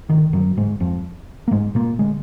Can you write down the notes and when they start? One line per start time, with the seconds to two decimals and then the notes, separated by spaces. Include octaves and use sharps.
0.09 G#1 F#2 D3 D#3
0.33 F#2 F#3
0.57 G#2 G#3
0.80 F2 F3
1.48 A#3
1.51 G#2 G#3
1.75 A#2 A#3
1.99 D3 G#3